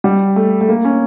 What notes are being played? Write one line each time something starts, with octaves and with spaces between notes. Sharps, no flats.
G3
A3
A3
A#3
C#4